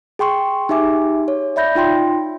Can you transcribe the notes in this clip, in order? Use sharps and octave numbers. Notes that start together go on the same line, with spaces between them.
G#4 G5 C6 C#6
D#4 G4 E5 G#5 D6
C#5
D5 E5 B5 G6 A#6
D#4 F4 G5 C6